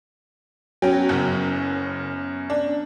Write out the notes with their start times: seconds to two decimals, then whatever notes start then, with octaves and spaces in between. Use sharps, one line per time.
0.82 F#3 B3 C#4 G5
1.09 F#1 F#2
2.50 D4